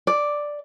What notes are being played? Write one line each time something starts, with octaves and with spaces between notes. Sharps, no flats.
D5